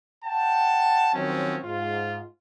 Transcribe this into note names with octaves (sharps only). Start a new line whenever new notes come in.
F#5 G5 A5
D#3 F3 F#3 C4 C#4
G#2 F4